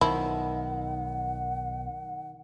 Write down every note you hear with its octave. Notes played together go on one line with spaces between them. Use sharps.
B1 D#3 F3 E4 F#5